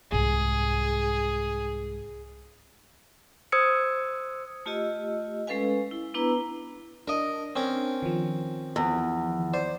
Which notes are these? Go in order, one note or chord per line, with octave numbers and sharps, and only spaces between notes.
C2 G#2 G#4
C5 D#6 E6 G#6 C#7
A3 F4 G4 D#5 E6
G#3 C#4 A4 B4 F5 G#5
E4
B3 D4 E4 B4 A#5 E6
D4 A#4 D#5
C4 C#4 A#4
D#3 F3
E2
C5 D5